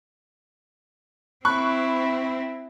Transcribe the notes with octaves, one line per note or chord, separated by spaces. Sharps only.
C4 E4 B5 C#6 F#6